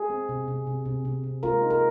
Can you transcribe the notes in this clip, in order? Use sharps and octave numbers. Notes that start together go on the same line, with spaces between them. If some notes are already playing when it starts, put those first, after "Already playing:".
Already playing: G#4
C4
C3
C3
C3
C3
C3
C3
G#3 F4 A#4
D#4
A#4